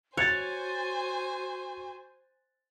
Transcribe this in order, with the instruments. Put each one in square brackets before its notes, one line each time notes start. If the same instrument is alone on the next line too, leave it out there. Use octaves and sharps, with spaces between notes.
[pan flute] F#4 [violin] C5 G#5 [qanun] C#5 [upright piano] F#6 G#6 A6